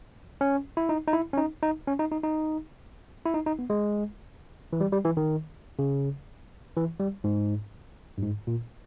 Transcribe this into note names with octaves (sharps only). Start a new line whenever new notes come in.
C#4
E4
D#4
D#4
E4
C#4
D#4
D#4
C#4
D#4
D#4
D#4
E4
D#4
D#4
B3
G#3
E3
G3
G3
E3
D#3
C#3
E3
G3
G#2
G2
G#2
A#2